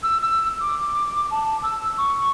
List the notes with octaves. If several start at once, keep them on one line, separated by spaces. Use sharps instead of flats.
E6
E6
D6
A5
E6
C#6